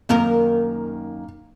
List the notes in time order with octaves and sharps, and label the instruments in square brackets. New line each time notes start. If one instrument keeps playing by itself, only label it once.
[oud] F#2 D#3 A#4 [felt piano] A#3